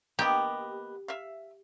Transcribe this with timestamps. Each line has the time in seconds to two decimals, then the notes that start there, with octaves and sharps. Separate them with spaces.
0.19 A#3 B3 G4 D#5
1.08 E5 F5